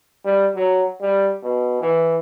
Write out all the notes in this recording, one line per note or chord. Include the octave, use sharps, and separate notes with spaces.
G3
F#3
G3
B2
E3